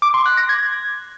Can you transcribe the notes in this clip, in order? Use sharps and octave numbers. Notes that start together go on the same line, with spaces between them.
D6
C6
F#6
A#6
G#6